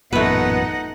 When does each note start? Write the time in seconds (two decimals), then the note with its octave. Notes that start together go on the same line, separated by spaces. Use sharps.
0.13 A1 F#2 A#2 A3 B3 D#4 B4 F#5